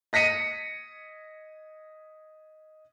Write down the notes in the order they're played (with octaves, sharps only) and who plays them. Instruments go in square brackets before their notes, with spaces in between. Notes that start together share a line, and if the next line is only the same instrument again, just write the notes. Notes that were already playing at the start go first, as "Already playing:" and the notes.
[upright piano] D#5 A#6 B6 C#7 D#7